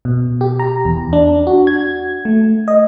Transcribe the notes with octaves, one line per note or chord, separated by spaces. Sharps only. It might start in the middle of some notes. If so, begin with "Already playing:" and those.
B2
G4
A#5
E2
D4
F#4
G#6
A3
D#5